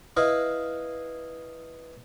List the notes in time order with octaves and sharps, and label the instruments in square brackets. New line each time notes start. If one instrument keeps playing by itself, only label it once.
[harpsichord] E4 B4 D#5 F5